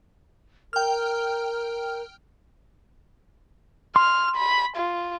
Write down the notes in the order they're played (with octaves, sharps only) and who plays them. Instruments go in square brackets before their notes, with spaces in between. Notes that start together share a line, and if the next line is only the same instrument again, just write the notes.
[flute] A#4 [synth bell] G5 F6
[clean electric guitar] C6 [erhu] F6
[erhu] B5
F4